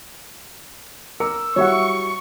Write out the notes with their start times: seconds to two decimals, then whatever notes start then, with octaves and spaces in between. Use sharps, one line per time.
1.20 A#4 A#5 D6 E6 C#7
1.56 F#3 G3 E4 C#5 E5 F#5 C#6